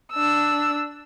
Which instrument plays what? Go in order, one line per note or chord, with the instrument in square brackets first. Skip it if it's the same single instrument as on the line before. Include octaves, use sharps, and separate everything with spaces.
[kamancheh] D4 E6